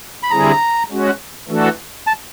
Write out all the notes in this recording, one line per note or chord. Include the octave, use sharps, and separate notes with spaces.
B5
D3 G3 C4 E4 G#4 A#5
G#3 C#4 F#4
E3 A3 D4 F#4 A4
A5